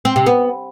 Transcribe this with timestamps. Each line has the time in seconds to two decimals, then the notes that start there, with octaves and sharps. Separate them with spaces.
0.05 C4
0.16 C3
0.26 B3